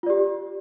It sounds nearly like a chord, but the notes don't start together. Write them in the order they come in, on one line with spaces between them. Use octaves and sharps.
F4 D5 G4